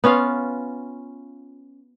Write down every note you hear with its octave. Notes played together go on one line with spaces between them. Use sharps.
B3 C#4 F4 F5